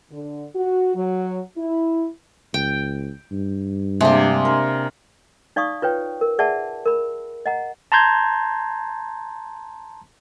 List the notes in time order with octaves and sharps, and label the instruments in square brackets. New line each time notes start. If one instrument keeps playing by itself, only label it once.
[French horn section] D3
F#4
F#3
E4
[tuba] C#2 [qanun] G5
[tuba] G2
[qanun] C3 A#3 [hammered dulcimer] G#3 D4
[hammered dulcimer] A#4
[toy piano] D#4 D5 F5 C#6 D#6
F4 B4 C#5 G5
A#4
G#4 D5 E5 F#5 A5
A#4 B5
D#5 F#5 A#5
[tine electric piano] A5 A#5 C6 G6 G#6